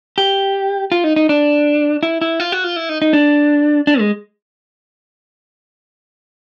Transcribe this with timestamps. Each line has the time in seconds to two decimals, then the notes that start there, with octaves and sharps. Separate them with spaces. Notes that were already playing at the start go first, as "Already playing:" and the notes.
0.18 G4
0.92 F4
1.04 D#4
1.16 D#4
1.29 D4
2.03 E4
2.21 E4
2.40 F4
2.52 F#4
2.64 F4
2.76 E4
2.89 D#4
3.02 D#4
3.13 D4
3.87 D4
3.99 G#3